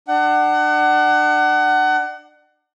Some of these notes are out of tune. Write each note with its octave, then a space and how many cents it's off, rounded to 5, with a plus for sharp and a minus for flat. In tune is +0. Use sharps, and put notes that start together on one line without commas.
D4 +30 F#5 +25